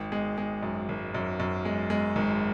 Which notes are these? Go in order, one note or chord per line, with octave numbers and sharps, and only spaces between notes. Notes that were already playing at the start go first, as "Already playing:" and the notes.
Already playing: G#1
G#3
G#3
F#2
G#1
F#2
F#2
G#3
G#3
G#1